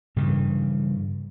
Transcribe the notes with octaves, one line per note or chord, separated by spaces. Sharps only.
G2 C#3 E3